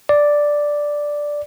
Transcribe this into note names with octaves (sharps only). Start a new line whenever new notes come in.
D5